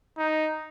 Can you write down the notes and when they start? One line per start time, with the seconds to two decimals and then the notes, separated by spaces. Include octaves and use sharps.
0.18 D#4